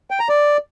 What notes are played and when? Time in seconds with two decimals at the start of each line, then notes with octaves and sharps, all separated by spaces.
0.10 G5
0.20 A#5
0.29 D5